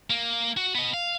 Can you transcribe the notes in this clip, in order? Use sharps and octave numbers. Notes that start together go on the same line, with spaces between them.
A#3
F#4
B3 D#5
F5